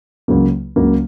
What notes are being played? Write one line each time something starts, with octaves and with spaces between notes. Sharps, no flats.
C#2 C#3 F#3 A#3
C#2 C#3 F#3 A#3